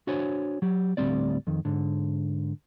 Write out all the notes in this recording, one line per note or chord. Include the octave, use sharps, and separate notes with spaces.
D4 F#4 C5 C#5 G#5
F#3 G4
D2 A2 G3 C4 D5
F2 D#3
G#2 D3